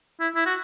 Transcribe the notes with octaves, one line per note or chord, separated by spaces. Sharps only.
E4
E4
F#4